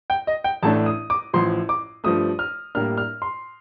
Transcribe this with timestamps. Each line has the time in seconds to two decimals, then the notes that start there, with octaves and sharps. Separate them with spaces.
0.10 G5
0.27 D#5
0.44 G5
0.63 A1 A2 A3 D4 A5
0.86 D#6
1.10 D6
1.33 A1 A2 F3 C6
1.69 D6
2.04 G2 F3 A3 D#6
2.39 F6
2.75 A2 G3 A#3 D4 F6
2.98 F6
3.22 C6